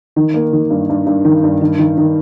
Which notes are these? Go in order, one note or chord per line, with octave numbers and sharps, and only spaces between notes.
D#3
A#3
D#3
G2
G2
G2
D#3
G2
D#3
D#3
D#3